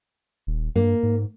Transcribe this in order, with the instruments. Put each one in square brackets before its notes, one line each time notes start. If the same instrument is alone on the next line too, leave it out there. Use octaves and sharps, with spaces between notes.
[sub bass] D#1
[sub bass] G2 [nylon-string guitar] A#3
[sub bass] G#2